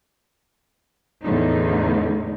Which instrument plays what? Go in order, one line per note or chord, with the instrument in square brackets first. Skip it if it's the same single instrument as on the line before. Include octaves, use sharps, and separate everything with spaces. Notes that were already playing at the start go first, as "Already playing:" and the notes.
[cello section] E2 A2 D3 D#4